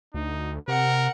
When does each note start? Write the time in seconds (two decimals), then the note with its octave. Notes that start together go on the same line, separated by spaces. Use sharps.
0.14 D2 D#4
0.68 C3 A#4 F#5